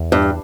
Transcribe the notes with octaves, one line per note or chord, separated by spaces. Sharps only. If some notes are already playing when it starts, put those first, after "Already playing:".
Already playing: E2
G2